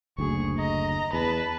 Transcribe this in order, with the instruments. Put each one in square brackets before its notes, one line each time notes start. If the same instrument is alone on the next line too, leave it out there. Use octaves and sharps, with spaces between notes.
[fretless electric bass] F#1 D2 [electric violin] G#4 C#6
[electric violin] D#5 A#5
[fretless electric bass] E2 [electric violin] B4 A5